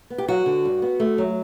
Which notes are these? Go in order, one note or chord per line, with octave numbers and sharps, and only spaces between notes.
B3
G4
F#3 F#4
D3
G2
B3
A3
F#3